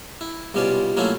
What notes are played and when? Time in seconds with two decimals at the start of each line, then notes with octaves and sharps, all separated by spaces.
0.21 E4
0.54 C2 B2 G3 C#4 F4 D5
0.97 F#3 A3 A#3 C#4 E4 F4